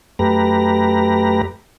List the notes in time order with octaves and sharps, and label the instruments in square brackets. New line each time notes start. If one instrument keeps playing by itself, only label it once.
[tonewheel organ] F#2 A3 G4 B4 A#5